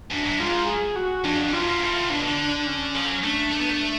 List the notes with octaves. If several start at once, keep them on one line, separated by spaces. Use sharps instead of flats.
F#2 D4
F#2
G#2 F4
G#4
F#4
F2 D4
F2
F#2 F4
G#2
A2
B2 D4
D3
C#4
F3
F#3
A3 D4
A3
B3
A3